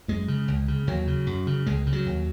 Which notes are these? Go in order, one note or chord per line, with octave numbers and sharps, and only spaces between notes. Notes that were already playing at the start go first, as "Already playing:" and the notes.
F#2 G#3
C#3
C#2
C#3
D#2 F#3
C#3
F#2
C#3
C#2 G#3
C#3
F#3
D#2